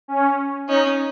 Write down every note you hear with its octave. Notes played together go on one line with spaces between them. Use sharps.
C#4
C#4 D#4